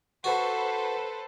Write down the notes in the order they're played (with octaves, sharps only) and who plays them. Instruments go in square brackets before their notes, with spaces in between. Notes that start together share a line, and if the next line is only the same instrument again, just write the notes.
[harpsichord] F#4 [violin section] A4 B4 C5